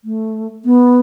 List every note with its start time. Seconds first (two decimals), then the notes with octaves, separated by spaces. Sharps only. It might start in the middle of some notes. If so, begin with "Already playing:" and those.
0.05 A3
0.65 B3